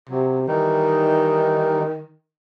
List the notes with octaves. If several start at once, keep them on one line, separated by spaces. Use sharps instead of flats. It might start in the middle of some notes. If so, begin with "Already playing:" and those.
C3 F#3
D#3 E3 G3 D#4